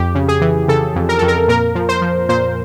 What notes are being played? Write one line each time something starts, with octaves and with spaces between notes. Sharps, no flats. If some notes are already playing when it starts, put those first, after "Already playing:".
Already playing: F2 G4
C#3
G#4
E3
C#3 A4
F2
A#4
F2 A4
A#4
A#2 A#4
F3
C5
F3
A#2 C5